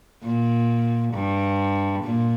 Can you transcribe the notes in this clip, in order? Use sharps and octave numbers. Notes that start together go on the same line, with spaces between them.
A#2
G2
A#2